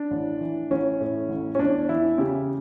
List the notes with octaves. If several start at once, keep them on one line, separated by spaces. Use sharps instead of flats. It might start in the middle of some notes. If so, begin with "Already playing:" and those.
Already playing: D4
A1
E3
A1 C#4
A2
A1
C#4
E2 D4
E3 E4
C#3 G4